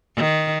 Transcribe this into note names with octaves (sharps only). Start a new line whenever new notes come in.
D#3